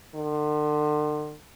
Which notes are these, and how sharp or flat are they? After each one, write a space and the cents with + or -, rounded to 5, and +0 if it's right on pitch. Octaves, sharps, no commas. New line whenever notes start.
D3 +40